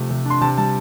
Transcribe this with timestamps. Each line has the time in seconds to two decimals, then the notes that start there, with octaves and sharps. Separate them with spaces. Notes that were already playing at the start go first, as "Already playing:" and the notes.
Already playing: C3 F3 A3
0.10 C3
0.26 D4 C6
0.41 C3 A5
0.58 G3 A5